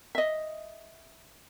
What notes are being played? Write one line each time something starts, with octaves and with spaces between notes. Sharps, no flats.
D#5 E5